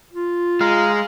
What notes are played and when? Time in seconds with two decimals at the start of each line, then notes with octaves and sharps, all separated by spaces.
0.13 F4
0.61 G#3 F5 A#5